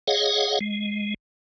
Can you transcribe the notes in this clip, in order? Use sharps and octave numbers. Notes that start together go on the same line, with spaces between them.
G#4 C#5 D#5 F5 F#5
G#3